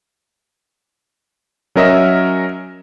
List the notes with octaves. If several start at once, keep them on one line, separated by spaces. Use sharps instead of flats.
F#3 C#4 A#4 D#5 E5